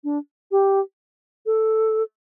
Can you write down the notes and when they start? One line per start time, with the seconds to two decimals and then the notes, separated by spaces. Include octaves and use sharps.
0.04 D4
0.51 G4
1.46 A4